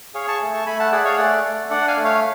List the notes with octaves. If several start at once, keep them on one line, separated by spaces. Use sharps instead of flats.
G#4 C#5 F5
A5 C#6
A3
A5 C#6
A3 G#5 B5
F#5 A5
G#4 D5 F#5
C#5 F5
A3 D5 F#5
A3
D4 D5 F#5
F5 G#5
A3
C#5 F5